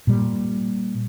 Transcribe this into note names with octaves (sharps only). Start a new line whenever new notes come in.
A#2 G3